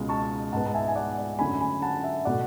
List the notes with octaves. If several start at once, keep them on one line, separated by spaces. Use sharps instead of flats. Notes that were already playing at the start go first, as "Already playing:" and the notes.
Already playing: C#2 B2 G#3
A5 C#6
G#2 G#3 B3 F#5 A5
A5
E5 G#5
G#5
D5 F#5
D5
F#2 D3 A3 G#5 B5
G#5 B5
F#5 A5
E5
B2 A3 D5 F#5